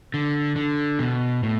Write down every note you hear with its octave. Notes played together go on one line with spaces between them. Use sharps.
D3
D3
B2
A2